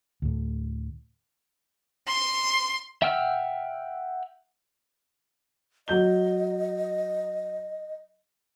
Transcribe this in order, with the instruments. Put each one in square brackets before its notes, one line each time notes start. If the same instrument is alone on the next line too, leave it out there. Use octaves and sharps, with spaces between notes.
[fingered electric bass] D2 A2
[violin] C6 C7
[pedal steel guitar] E5 F#5 G5 E6 F6
[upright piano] F#3 G6 G7 [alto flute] D#5